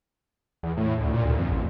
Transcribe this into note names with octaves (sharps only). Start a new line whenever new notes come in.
E2
A2
D2
A#2
D2
F2
A1